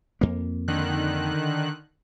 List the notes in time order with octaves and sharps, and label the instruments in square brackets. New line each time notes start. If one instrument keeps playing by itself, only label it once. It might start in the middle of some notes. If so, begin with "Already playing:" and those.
[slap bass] F2 A#3
[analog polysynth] D3 D#3 F#6